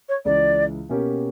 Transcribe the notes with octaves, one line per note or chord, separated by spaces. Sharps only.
C#5
C#2 C#3 E3 D5
B2 A#3 C#4 G4 A#4